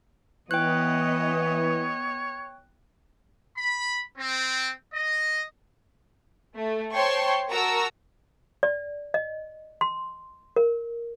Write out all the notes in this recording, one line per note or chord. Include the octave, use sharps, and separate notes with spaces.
E3 B3 C#5 D#5 G5 F#6
B5
C4
D#5
A3
C5 C#5 G5 A5 C6 C#6
F#4 A#4 A5 A#5 C#6 E6
D5
D#5
C6
A#4